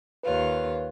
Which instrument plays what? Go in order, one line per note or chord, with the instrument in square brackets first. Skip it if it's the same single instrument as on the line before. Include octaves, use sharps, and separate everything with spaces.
[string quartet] D#2 F4 [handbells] B4 C#5